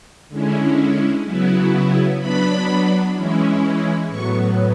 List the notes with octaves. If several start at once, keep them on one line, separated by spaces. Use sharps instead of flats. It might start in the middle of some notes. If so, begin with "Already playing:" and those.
D3 G#3 C#4 E4
C#3 F#3 B3 E4
F#3 B3 D4 B5
E3 G#3 C#4 E4
A2 F#3 B3 C#6